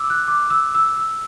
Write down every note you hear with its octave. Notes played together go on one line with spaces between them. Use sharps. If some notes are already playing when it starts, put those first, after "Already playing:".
Already playing: D6 E6
F#6
D6
E6
E6
E6